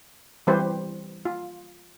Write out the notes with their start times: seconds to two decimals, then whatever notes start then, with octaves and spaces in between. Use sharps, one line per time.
0.47 E3 G3 C4 G4 B4 C5
1.25 F4